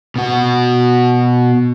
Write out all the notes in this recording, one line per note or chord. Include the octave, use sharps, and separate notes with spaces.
B2 F#4